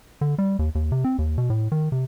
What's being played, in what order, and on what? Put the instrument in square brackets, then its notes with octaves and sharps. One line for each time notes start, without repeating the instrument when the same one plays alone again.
[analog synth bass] D3
G3
D#2
D#2
C3
C4
D#2
B2
A2
D#3
C3